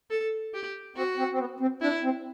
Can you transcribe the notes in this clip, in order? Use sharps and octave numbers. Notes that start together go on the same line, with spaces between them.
A4
G4
C4 F#4
C4
C4
B3
C4
D4 E4
C4